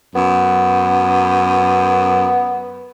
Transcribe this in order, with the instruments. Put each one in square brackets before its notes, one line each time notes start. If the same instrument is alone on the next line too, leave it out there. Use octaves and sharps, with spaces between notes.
[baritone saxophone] F#2 [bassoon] B3